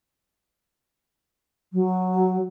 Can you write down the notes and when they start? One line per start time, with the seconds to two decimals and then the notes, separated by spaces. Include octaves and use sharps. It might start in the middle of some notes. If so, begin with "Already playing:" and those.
1.73 F#3